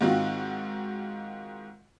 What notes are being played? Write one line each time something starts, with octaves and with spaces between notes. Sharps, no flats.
G#2 D#3 C4 F4 F#4